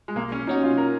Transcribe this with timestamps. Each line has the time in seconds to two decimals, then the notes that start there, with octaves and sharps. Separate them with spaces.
0.08 G#3
0.16 B1 A#3
0.32 C#4
0.47 B2 F#3 C#4 D#4 F#4
0.63 F4
0.78 A#4